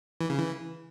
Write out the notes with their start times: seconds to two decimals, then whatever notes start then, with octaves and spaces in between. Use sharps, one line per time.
0.21 E3
0.30 C#3
0.39 E3